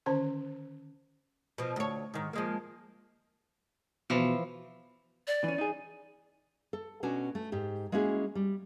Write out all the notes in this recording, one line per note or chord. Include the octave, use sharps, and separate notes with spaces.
D3 D#3 C#4 C5 A5 C6
B2 F3
D2 C#5
G#2 D#3
F3 G#3 A#3
B2 E3 F3
D5
E3 C#4
D#4 G#4
A4
B2 C#4 D4 F#4 G#5
A3
G#2 G4
G#3 A#3 C#4 E4 F#4 G#4
G3